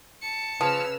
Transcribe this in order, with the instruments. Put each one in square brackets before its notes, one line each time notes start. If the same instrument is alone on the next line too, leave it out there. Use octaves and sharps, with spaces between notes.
[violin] A5 C#7
[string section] C#3 E6 F6 [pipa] F3 [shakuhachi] B4